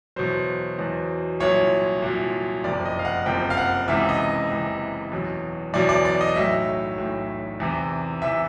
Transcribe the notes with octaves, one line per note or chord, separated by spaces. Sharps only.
E2 B2 F#3 C5
E2 B2 F#3
C2 A#2 F#3 C#5
C2 A#2 F#3
F#1 F2 C3 F3 D5
D#5
F5
F#5
F#1 F2 C3 F3 G5
F5
F#5
C#2 C3 E3 E5
D#5
C#2 C3 E3
E2 B2 F#3
E2 B2 F#3 D5
D5
D5
D#5
B1 A2 F#3 E5
B1 A2 F#3
E2 C3 E3
C3 E3 E5